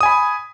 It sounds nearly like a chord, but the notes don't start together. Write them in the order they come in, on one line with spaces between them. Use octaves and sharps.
D#6 G#5 B5